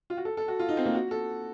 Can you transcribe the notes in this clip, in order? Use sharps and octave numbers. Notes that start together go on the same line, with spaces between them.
F4
F#4
A4
A4
F#4
F4
D#4
C4
A#3
F#4
A4